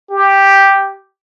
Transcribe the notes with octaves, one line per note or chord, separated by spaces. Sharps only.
G4